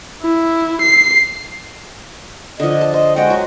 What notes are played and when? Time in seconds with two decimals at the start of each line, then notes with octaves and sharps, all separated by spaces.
0.22 E4
0.82 C7
2.60 D3 F3 D#5
2.81 A5
2.94 C5 D#5
3.16 G#3 F#4 D#5 F#5 G5
3.30 F#3